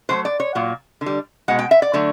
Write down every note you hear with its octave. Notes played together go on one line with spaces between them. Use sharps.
B2 F#3 A3 C5
D5
C#5
A#2 F#3
D3
G3
B2 G#3 F#5
G5
E5
D5
D3 F#3 A3